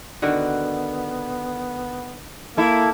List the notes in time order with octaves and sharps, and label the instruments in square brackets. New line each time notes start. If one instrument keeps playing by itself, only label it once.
[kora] D3 D#3 F#4 [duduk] B3
[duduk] A#3 [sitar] E4 A4